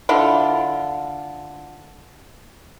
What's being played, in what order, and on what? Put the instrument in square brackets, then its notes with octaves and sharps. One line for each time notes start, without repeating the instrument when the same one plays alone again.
[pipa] D3 E4 F4